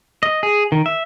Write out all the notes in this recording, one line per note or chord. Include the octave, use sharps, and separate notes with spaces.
D#5
G#4
D#3
E5